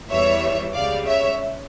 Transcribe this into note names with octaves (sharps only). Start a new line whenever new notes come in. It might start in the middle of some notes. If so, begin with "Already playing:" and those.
E2 E3 G3 C#5 E5
C#2 C#3 G3 D5 F5
C#5 E5